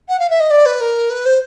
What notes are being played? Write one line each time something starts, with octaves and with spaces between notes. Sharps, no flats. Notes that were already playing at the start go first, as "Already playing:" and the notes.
F#5
F5
E5
D#5
D5
B4
A#4
B4
C5